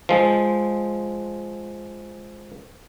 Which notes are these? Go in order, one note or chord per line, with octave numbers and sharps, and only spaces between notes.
F3 G#3